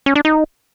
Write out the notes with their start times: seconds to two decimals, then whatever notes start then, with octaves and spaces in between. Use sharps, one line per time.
0.06 C#4
0.15 D4
0.25 D#4